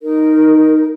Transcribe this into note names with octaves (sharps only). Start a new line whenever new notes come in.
D#4 A#4